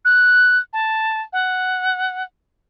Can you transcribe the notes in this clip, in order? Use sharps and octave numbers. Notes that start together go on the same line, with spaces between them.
F#6
A5
F#5